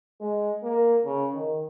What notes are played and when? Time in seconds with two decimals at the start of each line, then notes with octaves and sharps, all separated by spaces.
0.21 G#3
0.63 A#3
1.05 C#3
1.34 D#3